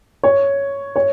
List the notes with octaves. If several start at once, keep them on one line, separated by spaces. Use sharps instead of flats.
C#5
C#5